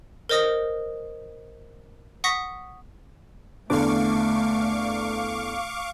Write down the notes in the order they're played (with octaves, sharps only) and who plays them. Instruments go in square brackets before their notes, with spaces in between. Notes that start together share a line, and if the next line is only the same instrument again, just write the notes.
[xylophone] A#4 C5 D#5 D#6 A#6
F#5 C#6 D#6 A#6 B6
[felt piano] E2 D3 D4 [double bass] A3 [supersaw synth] F5 C#6 D6